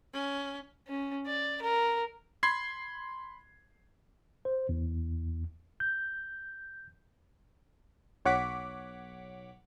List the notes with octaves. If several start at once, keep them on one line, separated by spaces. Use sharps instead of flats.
C#4
C#4
D5
A#4
B5 C6 G#6 C7
C5
E2
G6
B1 C#5 F#5 D6 B6